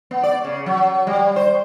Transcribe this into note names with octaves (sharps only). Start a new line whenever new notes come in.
B3
D5
C#3
F#3
G3
C5